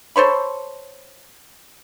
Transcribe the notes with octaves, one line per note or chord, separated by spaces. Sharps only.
A4 C5 C#5 B5